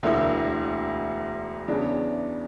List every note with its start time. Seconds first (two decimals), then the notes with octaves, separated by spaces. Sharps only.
0.03 E1 D2 D3 A#3 E4
1.68 E2 C#3 E3 B3 D4